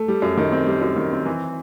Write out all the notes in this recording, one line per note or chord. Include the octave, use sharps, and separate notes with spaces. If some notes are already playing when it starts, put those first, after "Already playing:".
Already playing: A3
G3
F#2
D#3
C4
G3
F#2
D#3
C4
E3